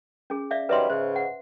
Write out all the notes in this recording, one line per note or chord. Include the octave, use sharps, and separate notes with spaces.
C#4 G#4
D5 E5 F5
D#3 F#3 G3 B4 E5 C6
G#2 C#3 C5
F#5